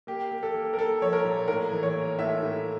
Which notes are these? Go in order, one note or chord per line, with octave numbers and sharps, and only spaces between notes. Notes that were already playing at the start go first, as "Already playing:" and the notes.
A#3 G4
A#3
A4
A#3
A#4
A#3 A4
F3 C#5
A#4
A#2
A2 A#4
E3
C#5
A#3
A2 E5
A2